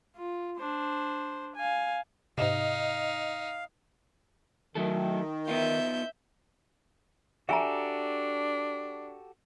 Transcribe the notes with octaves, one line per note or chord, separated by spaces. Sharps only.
F4
D4 C5
F5 G#5
G#2 C3 D#4 D#5 F5
D#3 F#3 A3 A4
B3 D#4 F4 E5 G6
D4 F#4 G4 A4 E5 G#5 A#5